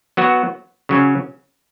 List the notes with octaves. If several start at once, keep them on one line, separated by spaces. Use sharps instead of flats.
F#3 B3 F#4
C#3 F#3 C#4